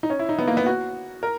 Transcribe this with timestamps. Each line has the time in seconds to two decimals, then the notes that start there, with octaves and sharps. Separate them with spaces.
0.03 D#4
0.10 C#4
0.19 E4
0.29 D#4
0.38 B3
0.48 A#3
0.57 B3
0.66 F#4
1.23 A#4